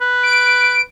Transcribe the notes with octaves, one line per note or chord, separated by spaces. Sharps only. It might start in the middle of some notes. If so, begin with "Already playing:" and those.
B4
D7